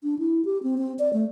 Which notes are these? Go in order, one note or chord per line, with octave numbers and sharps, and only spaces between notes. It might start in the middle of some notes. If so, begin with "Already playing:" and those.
D4
E4
G4
C4
C4
D5
A3